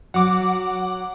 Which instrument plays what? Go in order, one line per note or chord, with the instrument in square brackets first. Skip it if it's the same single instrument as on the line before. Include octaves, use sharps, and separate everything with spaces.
[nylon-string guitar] F#3 [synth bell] F#5 D6